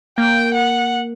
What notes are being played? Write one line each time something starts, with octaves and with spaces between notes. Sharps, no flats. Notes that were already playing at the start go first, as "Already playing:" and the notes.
A#3 G5
F#5